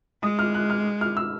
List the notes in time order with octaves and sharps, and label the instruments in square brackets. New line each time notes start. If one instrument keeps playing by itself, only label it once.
[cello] G#3 [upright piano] D#6
[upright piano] F6
F#6
F6
F6
E6